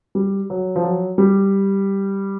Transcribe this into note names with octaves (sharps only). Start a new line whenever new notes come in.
G3
F#3
F3
F#3
G3